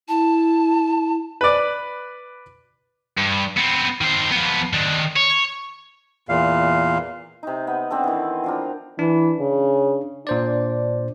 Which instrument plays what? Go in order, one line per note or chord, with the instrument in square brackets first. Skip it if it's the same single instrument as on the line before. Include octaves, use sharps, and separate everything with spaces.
[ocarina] E4 [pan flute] A5
[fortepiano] B4 D5
[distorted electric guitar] G2
B3 C4
D#3 C5
F3 B3
D#3 D4
C#5
[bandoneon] E2 A#2 F5
[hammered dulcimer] C3 D#4
B3
B3 C4 D4 A4
D#3 E3
F3 D4 A#4
[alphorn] E3 [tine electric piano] D4
[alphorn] C#3
[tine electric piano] A#2 C5 D5 [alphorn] D4